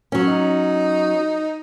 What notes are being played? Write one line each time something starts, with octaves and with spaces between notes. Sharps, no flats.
F#3 C#4
D#4